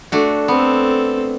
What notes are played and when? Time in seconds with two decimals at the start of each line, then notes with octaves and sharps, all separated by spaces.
0.12 A3 D4 F#4
0.48 B3 C4 A4